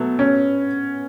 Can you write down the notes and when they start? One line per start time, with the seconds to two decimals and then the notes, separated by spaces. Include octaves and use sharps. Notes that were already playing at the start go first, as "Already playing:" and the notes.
Already playing: B2 F#3 A3 B3
0.19 C#4